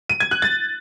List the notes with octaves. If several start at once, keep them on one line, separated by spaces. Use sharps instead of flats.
D#7
G#6
F#6
A6